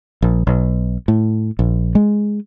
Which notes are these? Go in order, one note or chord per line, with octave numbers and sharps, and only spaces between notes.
A#1
B1
A2
A#1
G#3